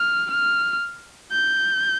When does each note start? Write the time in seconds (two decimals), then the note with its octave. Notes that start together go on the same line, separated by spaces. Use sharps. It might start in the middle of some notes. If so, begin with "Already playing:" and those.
Already playing: F6
0.31 F6
1.32 G6